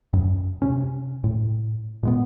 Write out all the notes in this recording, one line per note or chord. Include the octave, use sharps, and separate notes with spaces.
F#2
C3 C#4
A2
A#2 G#3 B3